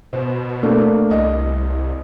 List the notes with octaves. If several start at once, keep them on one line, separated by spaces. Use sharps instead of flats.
B2 C5
A3 A#3 D4
C2 D#5